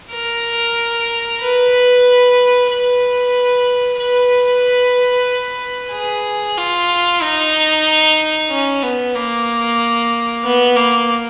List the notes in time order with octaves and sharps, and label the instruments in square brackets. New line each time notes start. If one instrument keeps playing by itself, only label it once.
[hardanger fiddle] A#4
B4
B4
B4
G#4
F4
D#4
C#4
B3
A#3
B3
A#3